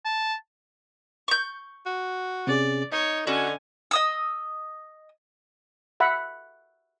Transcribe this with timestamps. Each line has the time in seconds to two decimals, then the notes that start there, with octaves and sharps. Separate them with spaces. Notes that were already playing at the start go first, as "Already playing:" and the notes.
0.05 A5
1.28 C#6 G6
1.86 F#4
2.47 C3 C#4 G#4 D5
2.92 D#4 C#5 D#5
3.27 D3 C#4 F#4 F#5 G#5
3.91 D#5 D#6 E6
6.00 E5 F#5 B5